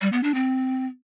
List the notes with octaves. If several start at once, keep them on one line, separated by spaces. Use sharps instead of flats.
G3
B3
D4
C4